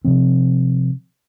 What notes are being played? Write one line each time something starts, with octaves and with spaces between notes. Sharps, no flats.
C3 F3 C4